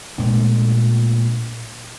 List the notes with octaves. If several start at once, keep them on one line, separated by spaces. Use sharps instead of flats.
A#2 G#3 A3 D4